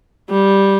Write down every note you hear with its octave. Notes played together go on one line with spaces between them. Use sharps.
G3